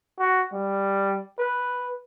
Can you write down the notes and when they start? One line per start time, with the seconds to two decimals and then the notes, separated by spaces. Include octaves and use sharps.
0.19 F#4
0.53 G3
1.39 B4